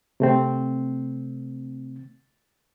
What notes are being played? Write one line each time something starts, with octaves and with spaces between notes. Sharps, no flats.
C3 A3 C4